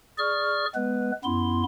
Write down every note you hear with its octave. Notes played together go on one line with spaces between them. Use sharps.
G#4 D5 C#6 F6
G#3 B3 B4
F#2 B3 E4 C6